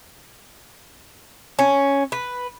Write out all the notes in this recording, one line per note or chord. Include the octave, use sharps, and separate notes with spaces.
C#4
B4